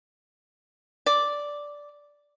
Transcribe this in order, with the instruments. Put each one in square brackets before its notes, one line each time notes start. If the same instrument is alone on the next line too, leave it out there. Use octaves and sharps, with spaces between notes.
[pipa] D5